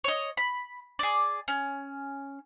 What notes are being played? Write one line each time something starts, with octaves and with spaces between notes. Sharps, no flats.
C#5 D#5
B5
G#4 D5
C#4